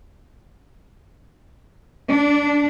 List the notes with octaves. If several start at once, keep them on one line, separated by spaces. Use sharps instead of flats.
D4